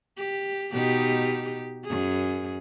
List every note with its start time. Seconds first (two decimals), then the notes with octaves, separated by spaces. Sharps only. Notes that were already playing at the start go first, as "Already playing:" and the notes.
0.17 G4
0.72 B2 D#4 G4
1.85 F#2 G#4